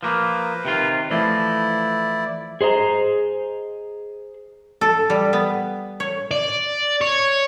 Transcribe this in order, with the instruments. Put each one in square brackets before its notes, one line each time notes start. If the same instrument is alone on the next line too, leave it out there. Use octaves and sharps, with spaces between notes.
[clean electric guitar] F3 A#3 [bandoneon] B4 C5
[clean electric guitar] C3 D#3 F4
[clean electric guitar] E3 F3 A3 [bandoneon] E4 D5
[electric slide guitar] G#4 C5 D#5 A#5
[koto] A4
G3
B3
C#5
[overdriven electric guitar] D5
C#5